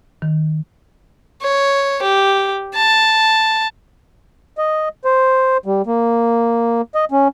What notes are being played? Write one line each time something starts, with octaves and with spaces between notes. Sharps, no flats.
D#3
C#5
G4
A5
D#5
C5
G3
A#3
D#5
C#4